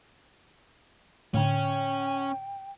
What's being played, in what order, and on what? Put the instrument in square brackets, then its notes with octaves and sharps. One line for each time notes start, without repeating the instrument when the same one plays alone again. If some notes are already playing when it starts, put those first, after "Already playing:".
[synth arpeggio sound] A2 D3 [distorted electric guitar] C#4 [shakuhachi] G5